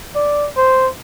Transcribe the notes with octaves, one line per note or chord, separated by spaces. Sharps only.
D5
C5